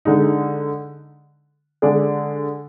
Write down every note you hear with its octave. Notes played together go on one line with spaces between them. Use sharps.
D3 G#3 D#4
D3 G#3 D4 G#4 D5